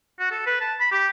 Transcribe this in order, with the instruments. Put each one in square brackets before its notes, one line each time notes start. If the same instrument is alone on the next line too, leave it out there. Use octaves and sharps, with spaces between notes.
[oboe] F#4
A4
B4
A5
B5
G4